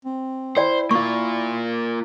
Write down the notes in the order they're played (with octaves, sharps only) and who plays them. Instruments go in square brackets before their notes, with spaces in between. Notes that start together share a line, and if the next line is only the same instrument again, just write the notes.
[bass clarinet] C4
[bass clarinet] E4 [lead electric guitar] C5 [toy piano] D5 G5
[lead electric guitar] A#3 F4 [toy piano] C#6